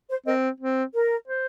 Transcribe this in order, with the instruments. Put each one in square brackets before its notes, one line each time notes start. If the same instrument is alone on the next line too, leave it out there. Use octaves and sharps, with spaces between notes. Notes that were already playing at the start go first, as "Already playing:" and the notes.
[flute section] C5
[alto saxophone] C4 [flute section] A#4 D#5
[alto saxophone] C4
[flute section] A#4
[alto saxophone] C5